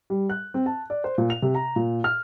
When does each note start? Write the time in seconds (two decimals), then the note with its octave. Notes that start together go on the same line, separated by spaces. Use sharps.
0.10 G3
0.30 F#6
0.54 C4
0.66 A5
0.90 D5
1.04 C5
1.18 A#2
1.30 F7
1.42 C3
1.55 A#5
1.76 A#2
2.04 F6